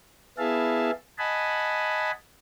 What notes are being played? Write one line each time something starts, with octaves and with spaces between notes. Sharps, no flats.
B3 E4 G#4 E5 F5 A5
D#5 F#5 G#5 A5 B5